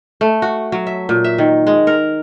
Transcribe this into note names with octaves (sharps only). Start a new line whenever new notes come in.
A3
F#4
F#3
E5
A#2
E5
D#3
G#3
A#4